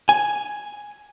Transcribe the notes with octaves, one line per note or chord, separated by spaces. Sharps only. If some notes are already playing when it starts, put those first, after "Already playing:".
G#5